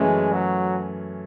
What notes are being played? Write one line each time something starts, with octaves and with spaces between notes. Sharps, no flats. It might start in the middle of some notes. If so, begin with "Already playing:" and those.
Already playing: F#2 E3 G#3 A3 C#4
F#3